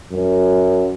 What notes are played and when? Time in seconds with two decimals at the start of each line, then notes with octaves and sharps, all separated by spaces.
0.11 F#2